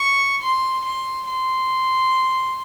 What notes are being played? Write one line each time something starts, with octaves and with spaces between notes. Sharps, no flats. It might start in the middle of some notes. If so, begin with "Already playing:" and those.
Already playing: C#6
C6
C6
C6